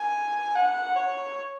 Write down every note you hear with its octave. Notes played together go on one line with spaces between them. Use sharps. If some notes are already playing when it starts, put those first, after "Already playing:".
Already playing: G#5
F#5
C#5